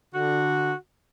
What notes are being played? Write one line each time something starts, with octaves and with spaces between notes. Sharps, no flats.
D3 F#4